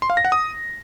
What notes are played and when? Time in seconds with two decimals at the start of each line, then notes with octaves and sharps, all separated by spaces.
0.02 C6
0.10 F5
0.17 A#6
0.25 F#5
0.32 D#6